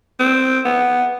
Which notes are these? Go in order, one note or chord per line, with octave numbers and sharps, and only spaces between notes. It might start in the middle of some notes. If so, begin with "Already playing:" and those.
C4
B3